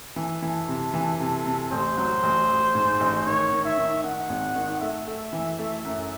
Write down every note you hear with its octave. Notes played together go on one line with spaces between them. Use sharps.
E3 A4
E3
C3
E3
C3
C3
A1 C5
F#3
A1
A1
G#2
A1
D#3 C#5
D#3
E5
D#3
D#3 F#5
G#1
D#3
A3 E5
A3
E3
A3
F#2